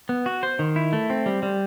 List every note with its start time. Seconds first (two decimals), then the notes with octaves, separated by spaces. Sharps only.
0.09 B3
0.26 F#4
0.43 C5
0.59 D#3
0.76 E4
0.93 A3
1.10 C4
1.26 G3
1.43 G3